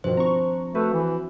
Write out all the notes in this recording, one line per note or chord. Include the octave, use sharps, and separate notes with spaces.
G2 B2 D#3 F3 D4 C5
C4 A#5 C#6
A3 F#4 B4
E3